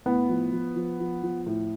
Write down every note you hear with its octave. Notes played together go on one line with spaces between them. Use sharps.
A2 B3
F3
F3
F3
F3
F3
A2